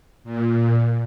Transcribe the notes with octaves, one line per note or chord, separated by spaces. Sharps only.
A#2